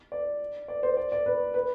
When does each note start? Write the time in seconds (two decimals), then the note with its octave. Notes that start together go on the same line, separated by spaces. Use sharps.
0.12 D5
0.68 D5
0.83 C5
0.97 D5
1.12 D5
1.26 B4
1.54 B4